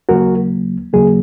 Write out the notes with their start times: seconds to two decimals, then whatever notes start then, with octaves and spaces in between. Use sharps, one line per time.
0.09 D#2 C#3 F#3 A#3 F#4 A#4
0.93 D#2 C#3 F#3 A#3 G#4